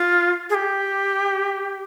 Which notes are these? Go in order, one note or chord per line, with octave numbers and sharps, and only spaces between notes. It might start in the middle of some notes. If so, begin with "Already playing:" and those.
Already playing: F4
G#4
G4